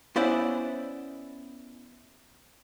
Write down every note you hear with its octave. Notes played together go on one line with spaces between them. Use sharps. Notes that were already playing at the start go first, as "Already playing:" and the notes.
B3 C#4 E4 C5 D5 F#5